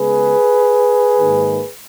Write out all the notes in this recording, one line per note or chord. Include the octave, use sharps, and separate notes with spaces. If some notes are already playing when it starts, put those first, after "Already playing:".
Already playing: C#3 G#3 B3 G#4 B4
G#2 D#3 A#3